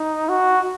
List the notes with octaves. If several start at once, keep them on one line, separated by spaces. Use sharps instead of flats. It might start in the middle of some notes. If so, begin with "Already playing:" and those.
Already playing: D#4
F#4